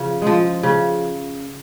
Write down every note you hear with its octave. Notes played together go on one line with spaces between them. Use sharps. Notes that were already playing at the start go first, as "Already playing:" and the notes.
Already playing: C#3 F3
F3 G#3
C#3